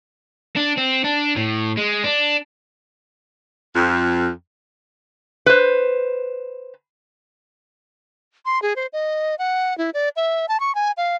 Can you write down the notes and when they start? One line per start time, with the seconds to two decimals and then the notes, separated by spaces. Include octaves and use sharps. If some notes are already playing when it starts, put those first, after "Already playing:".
0.56 D4
0.77 C4
1.04 D4
1.36 A2
1.78 G#3
2.04 D4
3.76 F2
5.46 B4 C5
8.45 C6
8.62 G#4
8.76 C5
8.93 D#5
9.39 F#5
9.78 E4
9.94 D5
10.16 E5
10.48 A5
10.60 C#6
10.75 G#5
10.97 F5